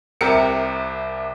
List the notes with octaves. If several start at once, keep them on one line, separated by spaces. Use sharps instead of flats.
C2 C3 G4 A#4 C#7